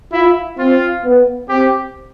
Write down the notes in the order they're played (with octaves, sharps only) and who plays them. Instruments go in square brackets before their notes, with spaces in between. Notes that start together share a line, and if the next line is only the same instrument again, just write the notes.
[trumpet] E4 [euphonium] F4
[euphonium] C4 [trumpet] F4
[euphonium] B3
[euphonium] C4 [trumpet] G4